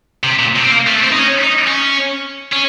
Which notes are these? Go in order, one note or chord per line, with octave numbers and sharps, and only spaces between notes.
C3
A#2
C3
C4
A#3
A3
C4
D#4
C#4
D#4
C#4
C#4